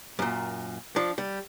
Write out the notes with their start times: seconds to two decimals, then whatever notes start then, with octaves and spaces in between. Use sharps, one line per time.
0.19 F#2 A#2
0.96 F3 D4
1.18 G3